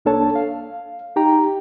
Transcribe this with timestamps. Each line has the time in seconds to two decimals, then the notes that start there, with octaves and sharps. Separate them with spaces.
0.05 C2 A#3 D4 A4 C#5 A5
0.35 F5
1.16 D#4 G4 G5 A#5